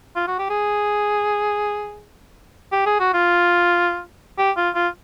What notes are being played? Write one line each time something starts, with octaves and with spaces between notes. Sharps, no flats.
F4
F#4
G4
G#4
G4
G#4
F#4
F4
G4
F4
F4